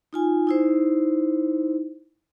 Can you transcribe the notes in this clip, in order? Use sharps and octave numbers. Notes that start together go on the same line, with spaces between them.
D#4 F4 G#5
D#4 E4 C5